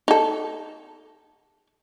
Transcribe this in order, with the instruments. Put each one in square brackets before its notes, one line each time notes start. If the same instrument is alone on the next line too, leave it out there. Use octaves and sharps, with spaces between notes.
[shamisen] D#4 A4